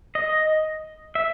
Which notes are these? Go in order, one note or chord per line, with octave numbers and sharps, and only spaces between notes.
D#5
E5